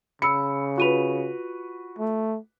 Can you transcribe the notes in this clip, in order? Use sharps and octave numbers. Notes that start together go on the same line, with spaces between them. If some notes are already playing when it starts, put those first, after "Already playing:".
C#3 B5 E6 C#7
F4 F#4 B4 D#7 F7
A3